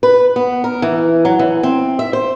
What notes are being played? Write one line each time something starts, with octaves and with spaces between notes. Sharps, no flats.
B4
B3
A#4
E3
F#3
E3
C4
E5
C5